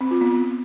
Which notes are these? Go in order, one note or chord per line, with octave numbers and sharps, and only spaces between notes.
C4
F4
B3